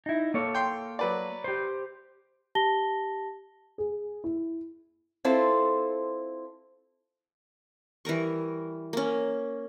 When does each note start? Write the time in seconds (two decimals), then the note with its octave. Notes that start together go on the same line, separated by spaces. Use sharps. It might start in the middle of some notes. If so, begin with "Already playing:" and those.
0.06 D#4 E4
0.34 A#3 A4 C#5
0.55 G5 C6
0.99 F#3 B4 D5
1.44 G4 C5
2.55 G4 A5 A#6 G7
3.78 G#4
4.24 E4
5.25 C4 E4 F4 A4 C5
8.05 E3 G3 A#4 C#6
8.93 A#3 C#4